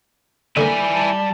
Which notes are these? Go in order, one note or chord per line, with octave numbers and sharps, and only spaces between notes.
D3 G3 A#3 E4 G#5
A5